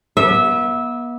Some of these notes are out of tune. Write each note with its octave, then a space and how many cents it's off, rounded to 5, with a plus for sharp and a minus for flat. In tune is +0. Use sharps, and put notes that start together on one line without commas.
B3 -40 E5 -15